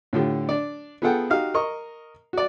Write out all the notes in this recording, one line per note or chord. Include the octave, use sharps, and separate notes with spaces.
A2 D3 F4 G4
D4 D5
B3 F4 G#4 A4 F#5 G5
D#4 F#4 G4 F5
A#4 D#5 C#6
F#4 D5